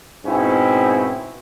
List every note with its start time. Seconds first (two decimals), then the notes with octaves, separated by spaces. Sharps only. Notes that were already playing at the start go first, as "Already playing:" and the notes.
0.25 G#2 B2 C4 C#4 E4